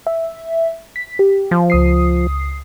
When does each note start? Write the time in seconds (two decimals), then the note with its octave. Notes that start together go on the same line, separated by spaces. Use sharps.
0.07 E5
0.96 B6
1.19 G4
1.51 F3
1.70 C#2 D#6 C7